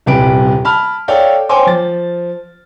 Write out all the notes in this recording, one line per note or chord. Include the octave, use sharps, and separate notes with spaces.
D#1 C2 G4 B4 D7
A5 B5 F6
A4 C#5 D5 F5 G5
C5 C#5 G5 G#5 C6 D6
F3 A6